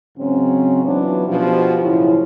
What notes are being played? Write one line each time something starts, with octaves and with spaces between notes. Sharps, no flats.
G#2 C#3 F#3 C4 C#4
E3 F#3 B3 C#4 D4 F4
B2 F3 G4
F#2 A2 C#3 F3 E4